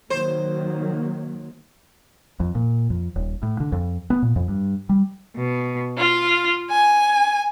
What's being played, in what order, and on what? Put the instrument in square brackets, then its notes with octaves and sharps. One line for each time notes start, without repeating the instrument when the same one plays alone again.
[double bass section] D#3 F#3 A#3 [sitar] C5
[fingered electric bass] F2
A#2
F2
D#1
A2
D3
F2
B3
A#2
F2
G2
G3
[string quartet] B2
F4
G#5